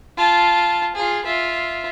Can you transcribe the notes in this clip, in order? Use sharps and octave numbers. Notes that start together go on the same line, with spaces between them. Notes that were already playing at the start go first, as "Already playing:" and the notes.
F4 A5
F4 G#4
F4 E5